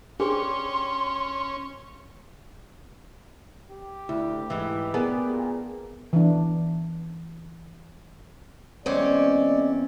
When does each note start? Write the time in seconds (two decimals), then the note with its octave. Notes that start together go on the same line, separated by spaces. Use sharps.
0.20 C#4 D4 G4 G#4 C5 C6
3.71 G4
4.09 D2 E4
4.50 G#2 E3
4.94 B3 D4 G#4 A#4
5.30 A#2
6.13 E3 D4
8.86 E2 G#3 C4 C#4 D5